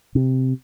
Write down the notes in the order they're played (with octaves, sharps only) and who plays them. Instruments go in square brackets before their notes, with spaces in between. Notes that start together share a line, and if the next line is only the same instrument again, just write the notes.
[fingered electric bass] C3